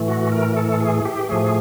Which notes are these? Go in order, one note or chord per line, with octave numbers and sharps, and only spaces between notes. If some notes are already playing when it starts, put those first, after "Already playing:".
Already playing: A2 E3 A3
F#4
A#4
A4
G#4
G4
A2 F3 A3 G#4